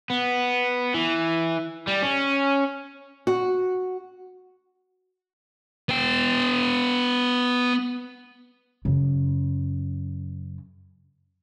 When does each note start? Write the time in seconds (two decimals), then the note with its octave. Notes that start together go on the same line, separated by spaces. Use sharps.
0.10 B3
0.94 E3
1.87 G3
2.03 C#4
3.27 F#4
5.89 B3 G5
8.85 F#2 C#3